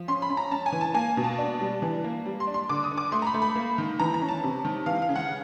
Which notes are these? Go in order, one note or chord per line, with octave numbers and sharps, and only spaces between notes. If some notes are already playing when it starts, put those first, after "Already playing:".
Already playing: F3
C#4 C6
B5
C#4
A#5
C#4 A5
G#5
E3
A5
A#3 G#5
B2
A5
D4
G3
E3
A#3
G3
C6
D4
C6
D3 D6
D#6
D3
D6
A3 C6
A#5
B5
A3
B5
A#3
D#3
E3 A#5
A#5
C#4
A5
C3
D#3
E3 F5
F5
C#3
F#5